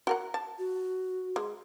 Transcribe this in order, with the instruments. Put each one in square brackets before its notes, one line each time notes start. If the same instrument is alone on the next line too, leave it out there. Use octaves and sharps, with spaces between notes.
[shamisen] F#4 A#4 F#5
A5
[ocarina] F#4
[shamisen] G#3